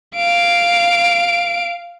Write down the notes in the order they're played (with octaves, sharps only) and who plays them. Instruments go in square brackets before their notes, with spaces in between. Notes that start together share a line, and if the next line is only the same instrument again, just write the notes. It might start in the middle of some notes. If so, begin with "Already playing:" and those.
[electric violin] F5 D7